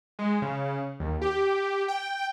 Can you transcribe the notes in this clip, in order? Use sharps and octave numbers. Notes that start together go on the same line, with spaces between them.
G#3
C#3
D#2
G4
G5